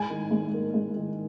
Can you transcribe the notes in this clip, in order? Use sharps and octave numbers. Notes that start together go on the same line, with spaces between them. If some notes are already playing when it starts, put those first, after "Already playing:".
Already playing: G#2 G#5
D#3
G#2
A#3
G#2
D#3